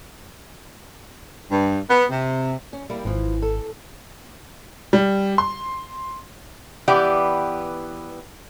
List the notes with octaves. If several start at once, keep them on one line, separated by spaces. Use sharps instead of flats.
G2
B3
C3
C#4
G3 A#3 E4
G#1 E3 F3
A4
G3
C6
E3 B3 G4 D5